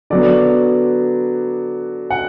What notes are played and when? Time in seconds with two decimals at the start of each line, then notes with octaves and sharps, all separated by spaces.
0.10 D3 F#3 B3 D5
2.10 F#5